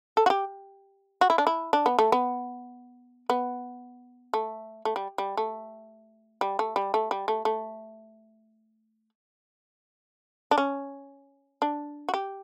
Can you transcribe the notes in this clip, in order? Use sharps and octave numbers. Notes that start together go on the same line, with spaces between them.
A4
F#4
G4
F#4
E4
D4
E4
D4
B3
A3
B3
B3
A3
A3
G3
G3
A3
G3
A3
G3
A3
G3
A3
A3
D4
C#4
D4
F#4
G4